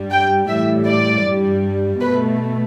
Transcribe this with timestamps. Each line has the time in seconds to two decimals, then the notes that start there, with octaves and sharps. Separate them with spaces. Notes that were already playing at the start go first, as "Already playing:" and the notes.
Already playing: G2 G3
0.11 G5
0.48 A2 E3 G3 E5
0.86 D5
1.25 G2 G3
2.01 B2 B4
2.06 A3